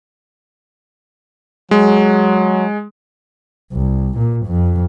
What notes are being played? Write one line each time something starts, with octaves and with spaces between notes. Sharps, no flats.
F#3 G#3
C2
A#2
F2